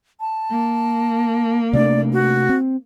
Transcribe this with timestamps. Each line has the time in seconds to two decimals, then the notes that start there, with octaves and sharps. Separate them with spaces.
0.20 A5
0.51 A#3
1.73 C3 A3 D4 D5
2.13 F#4
2.49 C4